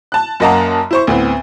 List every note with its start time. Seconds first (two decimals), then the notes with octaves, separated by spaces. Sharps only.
0.12 A5 F#6
0.40 F#2 A#3 D#5 F#5 A5 A#5
0.91 E4 C5 C#6
1.07 D2 A2 B3 C4